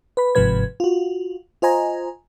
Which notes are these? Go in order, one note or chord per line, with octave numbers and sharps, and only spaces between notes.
B4 B5
G1 G#2 C3 F3 B4 G#6
F4 F#4
F4 C5 D#5 G#5 A#5